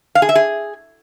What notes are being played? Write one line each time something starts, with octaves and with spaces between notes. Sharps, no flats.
F5
G#4
E5
G#4